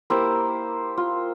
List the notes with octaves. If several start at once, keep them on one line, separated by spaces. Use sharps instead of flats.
A#3 E4 G4 C5
F4